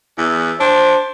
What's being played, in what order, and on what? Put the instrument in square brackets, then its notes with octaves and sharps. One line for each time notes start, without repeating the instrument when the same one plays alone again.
[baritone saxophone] E2
[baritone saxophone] D4 [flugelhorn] C5